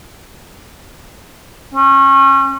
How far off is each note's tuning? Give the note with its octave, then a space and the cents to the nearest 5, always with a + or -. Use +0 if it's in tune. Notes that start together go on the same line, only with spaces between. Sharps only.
C#4 -30